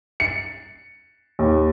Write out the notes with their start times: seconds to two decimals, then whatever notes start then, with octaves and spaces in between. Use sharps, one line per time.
0.20 C#7
1.39 D#2